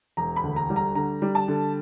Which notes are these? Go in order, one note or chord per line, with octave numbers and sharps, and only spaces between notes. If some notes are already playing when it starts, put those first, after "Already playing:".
E1 A#5
B5
D2
A#5
G3
A#5
D3 A#5
G3
A5
D3